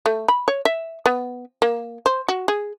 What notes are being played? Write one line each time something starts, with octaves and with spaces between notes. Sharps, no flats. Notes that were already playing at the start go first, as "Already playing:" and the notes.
A3
B5
C#5
E5
B3
A#3
C5
F#4
G#4